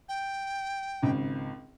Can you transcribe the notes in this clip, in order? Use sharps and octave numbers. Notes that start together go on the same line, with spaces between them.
G5
G#1 C#2